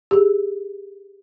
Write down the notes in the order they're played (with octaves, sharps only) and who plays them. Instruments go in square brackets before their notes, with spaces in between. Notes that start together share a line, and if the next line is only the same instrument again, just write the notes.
[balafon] G4 G#4